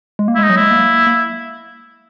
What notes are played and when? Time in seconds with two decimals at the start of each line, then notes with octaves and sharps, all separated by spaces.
0.19 G#3
0.28 A#3
0.35 E4
0.38 G#3 D#4
0.50 F#3
0.57 G#3 E4
0.71 A#3
1.07 A#3